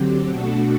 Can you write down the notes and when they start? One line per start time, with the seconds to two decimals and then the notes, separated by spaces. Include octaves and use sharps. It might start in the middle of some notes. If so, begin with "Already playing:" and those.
Already playing: D3 F#3 C4 G4
0.27 B2 A3 D4 F#4 A4